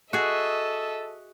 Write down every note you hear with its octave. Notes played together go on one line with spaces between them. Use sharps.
F#4 G#4 A4 D#5 E5